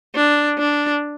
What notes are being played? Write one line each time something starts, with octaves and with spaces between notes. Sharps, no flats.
D4
D4